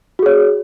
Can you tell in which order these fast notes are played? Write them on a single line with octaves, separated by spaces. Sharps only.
F#4 G#4 C#5